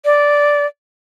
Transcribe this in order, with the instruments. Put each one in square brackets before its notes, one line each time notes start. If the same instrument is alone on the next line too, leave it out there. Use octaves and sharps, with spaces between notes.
[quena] D5